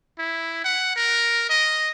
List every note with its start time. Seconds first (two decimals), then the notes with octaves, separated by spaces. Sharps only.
0.19 E4
0.64 F#5
0.96 A#4
1.49 D#5